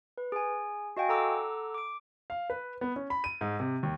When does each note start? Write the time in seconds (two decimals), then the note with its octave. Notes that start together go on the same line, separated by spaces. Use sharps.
0.18 B4
0.32 G#4 G#5
0.97 F#4 D#5 F5 G5 G#5
1.09 A4 F#5 A#5 D6 E6
1.74 D6 D7
2.30 F5
2.50 B4
2.81 B3
2.96 C#4
3.10 B5
3.24 D#7
3.41 G#2
3.60 C3
3.83 D#2